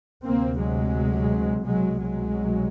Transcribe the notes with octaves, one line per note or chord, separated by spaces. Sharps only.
D2 C3 A#3 C4
F#3 G#3
C2 B2 F#3 G#3
F#3 G#3